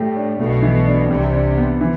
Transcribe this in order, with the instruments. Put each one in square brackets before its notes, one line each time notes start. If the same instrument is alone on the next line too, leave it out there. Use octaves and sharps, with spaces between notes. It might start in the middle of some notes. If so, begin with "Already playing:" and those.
Already playing: [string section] A2 [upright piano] G3 A3 G4
[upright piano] D4
[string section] B1 B2 [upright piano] A3
[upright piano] E3
D4
[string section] C2 C3 [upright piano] G3
[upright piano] D4
B3
E3